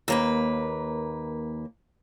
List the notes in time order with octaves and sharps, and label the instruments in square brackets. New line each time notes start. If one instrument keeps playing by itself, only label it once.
[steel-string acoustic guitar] D#2 A#3 B4